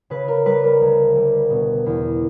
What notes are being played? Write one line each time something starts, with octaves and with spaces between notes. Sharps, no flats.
C#3 B4
A#4
G3 B4
A#4
D2
G3
B2
E2